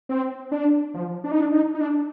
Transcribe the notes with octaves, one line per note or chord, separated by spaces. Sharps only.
C4
D4
F3
D4
D#4
D4
D#4
D#4
D4